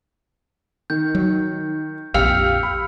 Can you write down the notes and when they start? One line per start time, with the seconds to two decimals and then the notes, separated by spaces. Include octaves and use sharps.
0.90 D#3 G6
1.15 F#3
2.14 A#1 F2 G4 F5 E6 F6 C#7 F7
2.63 B5